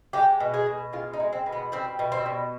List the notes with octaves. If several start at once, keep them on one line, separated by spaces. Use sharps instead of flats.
G#3 G4
B2
G#4
B2
G#3 F4
D#4
G#3
C4
B2
B3
G3 C4
B2
C4
B2